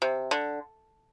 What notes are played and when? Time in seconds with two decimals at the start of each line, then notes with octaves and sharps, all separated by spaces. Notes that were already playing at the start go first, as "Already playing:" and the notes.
0.02 C3
0.31 D3